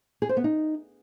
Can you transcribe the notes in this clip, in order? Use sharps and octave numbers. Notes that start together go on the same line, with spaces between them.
G#4
C5
B3
D#4